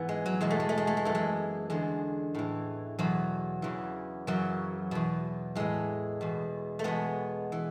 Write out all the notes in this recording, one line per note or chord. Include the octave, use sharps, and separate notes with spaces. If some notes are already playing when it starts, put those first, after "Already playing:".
Already playing: G#2 E3 B3
G#3
F#3
E2 B2 G#3
A3
G#3
A3
G#3
A3
G#3
F#2 E3 A3
G#3
E2 D3 G#3
A2 E3
E2 B2 F#3
E2 C#3 E3
F#2 C#3 E3 F#3
E2 B2
A2 E3 G#3
E2 B2
A3
E2 B2 G#3 B3
E3